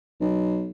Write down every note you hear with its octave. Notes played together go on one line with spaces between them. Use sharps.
B1